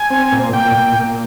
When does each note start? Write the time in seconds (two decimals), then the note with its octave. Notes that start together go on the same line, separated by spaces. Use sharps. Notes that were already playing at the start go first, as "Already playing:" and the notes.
Already playing: G#5
0.10 C4
0.32 A#2
0.53 A#2 G5
0.75 A#2
0.96 A#2